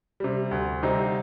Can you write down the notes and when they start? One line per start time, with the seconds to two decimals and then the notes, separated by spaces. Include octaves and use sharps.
0.20 C3 G3
0.51 D2
0.83 C3 G3 C4 D#4